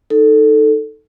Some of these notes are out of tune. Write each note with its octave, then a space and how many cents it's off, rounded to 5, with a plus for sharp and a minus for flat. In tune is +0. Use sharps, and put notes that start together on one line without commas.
D#4 +0 A4 +5